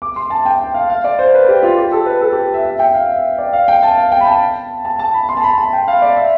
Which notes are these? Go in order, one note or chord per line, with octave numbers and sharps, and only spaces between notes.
D6
C6
A5
G5
G5
F5
F5
D5
C5
B4
G4
F4
G4
A4
B4
A4
G4
E5
E5
G5
F5
E5
D5
F5
G5
A5
F5
G5
B5
A5
A5
A5
B5
C6
A5
B5
A5
G5
F5
D5
E5